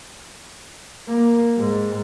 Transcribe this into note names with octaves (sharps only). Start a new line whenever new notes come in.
A#3
G#2